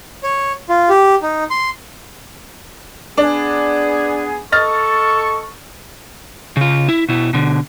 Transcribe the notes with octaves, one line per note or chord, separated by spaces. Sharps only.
C#5
F4
G4
D#4
C6
B3 D4 G#4
A4 D#5 C#6 F6 A6
C#3 F4
E4
B2 E4
B2 D3